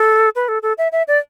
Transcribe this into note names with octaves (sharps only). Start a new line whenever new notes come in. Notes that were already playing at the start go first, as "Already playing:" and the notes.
Already playing: A4
B4
A4
A4
E5
E5
D5